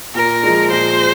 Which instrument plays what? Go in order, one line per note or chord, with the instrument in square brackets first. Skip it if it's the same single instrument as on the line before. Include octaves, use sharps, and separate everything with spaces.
[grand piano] A#2 [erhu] A#4
[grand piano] F3 G#3
[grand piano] A#2 [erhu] C5